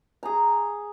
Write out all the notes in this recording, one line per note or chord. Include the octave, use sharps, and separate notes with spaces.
G#4 A#5